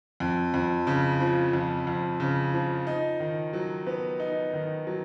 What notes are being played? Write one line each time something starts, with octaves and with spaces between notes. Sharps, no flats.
F2
F2
C#3
F3
F2
F2
C#3
F3
D#4
D#3
F#3
B3
D#4
D#3
F#3